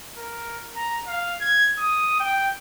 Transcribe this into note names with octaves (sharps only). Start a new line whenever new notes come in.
A#4
A#5
F5
G#6
D#6
G5